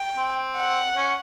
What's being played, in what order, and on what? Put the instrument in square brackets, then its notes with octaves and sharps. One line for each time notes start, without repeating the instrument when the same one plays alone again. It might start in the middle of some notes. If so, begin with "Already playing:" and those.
Already playing: [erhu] G5
[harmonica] C4
[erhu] F#5
[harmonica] C#4